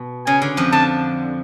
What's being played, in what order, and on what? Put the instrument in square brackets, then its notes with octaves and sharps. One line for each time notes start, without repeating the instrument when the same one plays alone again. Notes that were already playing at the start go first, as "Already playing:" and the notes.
Already playing: [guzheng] B2
[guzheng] C#3 [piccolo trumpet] G#5
[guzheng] D3
F2 F3
[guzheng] D3 [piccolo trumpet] A5